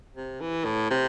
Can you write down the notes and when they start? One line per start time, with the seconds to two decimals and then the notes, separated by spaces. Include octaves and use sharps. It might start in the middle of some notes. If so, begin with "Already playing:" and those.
0.16 C3
0.41 E3
0.65 A2
0.91 C3